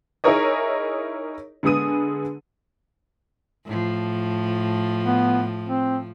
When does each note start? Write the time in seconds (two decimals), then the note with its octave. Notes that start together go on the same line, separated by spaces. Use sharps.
0.24 D#4 E4 G#4 A#4 C#5 D#5
1.63 D3 G#3 B3 G#4 D#6 D#7
3.65 A2 F3
5.05 B3
5.67 C4